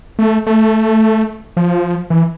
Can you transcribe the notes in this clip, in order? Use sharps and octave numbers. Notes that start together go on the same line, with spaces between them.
A3
A3
F3
E3